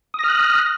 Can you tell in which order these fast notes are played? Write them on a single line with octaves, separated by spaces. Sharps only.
D#6 A#6 F6 F#6